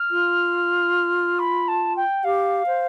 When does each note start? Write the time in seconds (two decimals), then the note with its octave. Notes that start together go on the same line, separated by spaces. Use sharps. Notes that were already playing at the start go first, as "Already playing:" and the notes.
Already playing: F6
0.11 F4
1.38 B5
1.67 A5
1.96 G5
2.24 G4 F5
2.67 C5